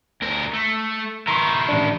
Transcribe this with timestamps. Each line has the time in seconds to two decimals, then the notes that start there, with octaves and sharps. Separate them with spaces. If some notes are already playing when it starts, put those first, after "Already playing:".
0.22 D2 A#4
0.53 A3
1.27 D#3 E4 A#5 C6 C#6
1.69 A1 D4